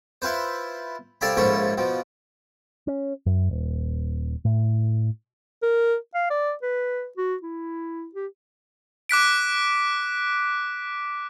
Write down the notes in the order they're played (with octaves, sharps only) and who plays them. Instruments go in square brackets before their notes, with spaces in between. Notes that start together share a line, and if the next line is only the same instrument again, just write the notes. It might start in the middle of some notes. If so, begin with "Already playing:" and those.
[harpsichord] E4 F4 B4 C5
C2 A4 D5 F5 G#5 B5
A#1 G#2 F3 C#4 E4 A4
B2 F3
[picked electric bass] C#4
F#2
D#1
A2
[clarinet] A#4
F5
D5
B4
F#4
E4
G4
[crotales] D6 F#6 B6 D7